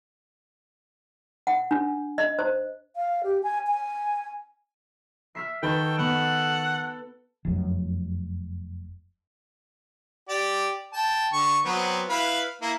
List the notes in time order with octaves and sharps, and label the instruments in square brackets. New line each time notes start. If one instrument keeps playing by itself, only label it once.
[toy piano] F#5
D4
D#5
C5
[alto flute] F5
G4
G#5
G#5
[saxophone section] E5 [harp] F6 B6 C7
[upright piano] D#3 [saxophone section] F#4 A4 [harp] B4 C#6 [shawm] G5
[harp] B3 [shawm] F#5
[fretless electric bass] F1 F#2
[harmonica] G4 D5
G5 A5
D3 C#6
F#3 B3 C4
E4 B4 F5
A#3 E4